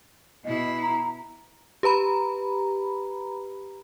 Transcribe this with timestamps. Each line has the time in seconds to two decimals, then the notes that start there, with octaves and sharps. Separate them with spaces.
0.45 B2 E4 D#5
0.82 A#5
1.83 G4 B4 A#5 B5